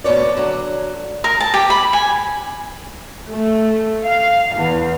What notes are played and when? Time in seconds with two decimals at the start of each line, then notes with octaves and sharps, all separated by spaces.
0.04 D2 B2 C#4 C#5 D5
0.37 D3 F#3
1.24 A#4
1.40 A5
1.54 G4
1.70 B5
1.93 G#5
3.32 A3
4.04 F5
4.56 E2